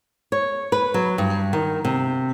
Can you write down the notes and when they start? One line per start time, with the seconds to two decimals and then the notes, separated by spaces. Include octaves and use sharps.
0.32 C#5
0.72 B4
0.94 F#3
1.18 G2
1.53 D#3
1.85 C3